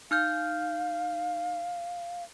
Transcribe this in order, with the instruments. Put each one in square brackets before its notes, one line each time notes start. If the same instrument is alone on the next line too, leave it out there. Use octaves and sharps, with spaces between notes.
[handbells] D#4 F6 G6 [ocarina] F5